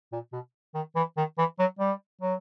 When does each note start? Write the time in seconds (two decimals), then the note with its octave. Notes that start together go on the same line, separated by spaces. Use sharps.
0.12 A#2
0.32 B2
0.74 D#3
0.96 E3
1.17 D#3
1.38 E3
1.59 F#3
1.79 G3
2.21 F#3